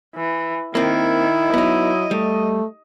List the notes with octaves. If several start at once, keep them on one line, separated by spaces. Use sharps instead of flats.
E3
D#3 A#3 C4 E4
F#3 B3 D#4 D#5
G3 A3